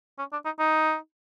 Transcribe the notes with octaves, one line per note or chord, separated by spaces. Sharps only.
C#4
D4
D#4
D#4